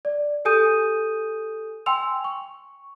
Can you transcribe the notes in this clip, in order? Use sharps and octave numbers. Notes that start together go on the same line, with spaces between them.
D5
G4 A4 G#5 D#6 G6 D#7
G5 G#5 C6 E6 F7
C#6